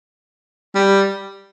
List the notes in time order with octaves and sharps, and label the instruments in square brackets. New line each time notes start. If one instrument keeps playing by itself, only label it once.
[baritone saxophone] G3